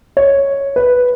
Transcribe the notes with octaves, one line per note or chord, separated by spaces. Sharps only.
C#5
B4